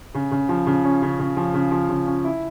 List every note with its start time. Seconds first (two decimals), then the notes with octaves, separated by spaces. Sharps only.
0.14 C#3
0.31 C#3
0.49 F3
0.67 C#3
0.84 C#4
1.02 C#3
1.19 C#3
1.37 F3
1.54 C#3
1.71 F3
1.89 C#3
2.06 C#4
2.25 E4